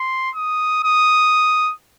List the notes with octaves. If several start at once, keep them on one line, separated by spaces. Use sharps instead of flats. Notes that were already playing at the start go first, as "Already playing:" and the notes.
Already playing: C6
D#6
D#6